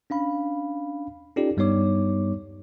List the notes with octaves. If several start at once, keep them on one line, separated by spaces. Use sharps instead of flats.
C#4 D4 F5 B5
C#4 D#4 F4 G4 A4 D5
G2 G3 B3 D#4 C#5 D6